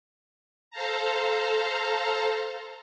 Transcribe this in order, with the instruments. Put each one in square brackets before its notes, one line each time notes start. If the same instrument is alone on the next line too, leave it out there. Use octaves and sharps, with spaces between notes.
[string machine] A4 C5 F5 A5 A#5